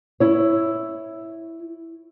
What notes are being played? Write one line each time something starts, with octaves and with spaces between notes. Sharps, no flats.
E4 C#5